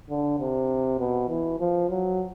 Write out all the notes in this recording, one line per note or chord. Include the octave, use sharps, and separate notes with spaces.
D3
C3
B2
E3
F3
F#3